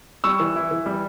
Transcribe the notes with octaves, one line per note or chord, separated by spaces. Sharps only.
G3 C#6 E6
E3
E4
E3
G3